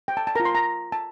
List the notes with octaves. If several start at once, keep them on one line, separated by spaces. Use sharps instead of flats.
G5
A5
A5
F4 A#4 A#5
C6
A#5
A5